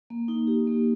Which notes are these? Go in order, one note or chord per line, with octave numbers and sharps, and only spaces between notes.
A#3
D#4
G4
A#3